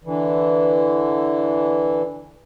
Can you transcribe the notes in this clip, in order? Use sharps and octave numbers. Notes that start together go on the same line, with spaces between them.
D3 E3